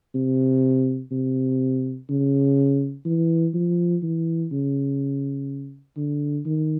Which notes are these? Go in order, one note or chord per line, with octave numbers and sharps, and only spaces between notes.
C3
C3
C#3
E3
F3
E3
C#3
D3
D#3